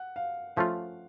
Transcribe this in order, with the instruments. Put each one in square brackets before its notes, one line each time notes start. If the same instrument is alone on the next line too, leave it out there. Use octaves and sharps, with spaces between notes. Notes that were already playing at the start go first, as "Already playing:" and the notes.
Already playing: [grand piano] F#5
F5
[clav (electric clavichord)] F3 A3 C#4 F4 [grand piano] F5